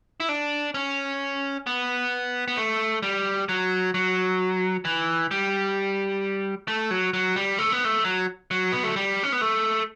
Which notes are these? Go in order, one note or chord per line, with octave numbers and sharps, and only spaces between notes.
E4
D4
C#4
B3
B3
A3
G3
F#3
F#3
E3
G3
A3
F#3
F#3
G3
A3
B3
A3
F#3
F#3
B3
A3
G3
C#4
B3
A3